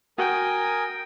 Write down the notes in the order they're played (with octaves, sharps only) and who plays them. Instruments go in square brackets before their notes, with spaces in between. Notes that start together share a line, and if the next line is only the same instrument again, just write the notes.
[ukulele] F#4 [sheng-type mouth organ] A#4 G#5 D#6 [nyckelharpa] G5